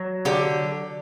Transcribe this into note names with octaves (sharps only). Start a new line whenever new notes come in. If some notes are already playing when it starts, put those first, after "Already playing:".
Already playing: F#3
D3 G4